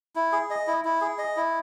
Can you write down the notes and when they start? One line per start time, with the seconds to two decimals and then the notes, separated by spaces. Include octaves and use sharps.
0.16 E4
0.32 G#4
0.50 D#5
0.67 E4
0.84 E4
1.01 G#4
1.18 D#5
1.36 E4